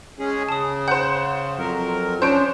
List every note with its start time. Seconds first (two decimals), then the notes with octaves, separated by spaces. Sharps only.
0.19 G#3 C#4 G#4
0.49 C#3 A5 D#6
0.88 C5 F#5 G6
1.59 F2 F#3 A#4
2.22 F3 C#4 D4 C5 C#5 G6 D7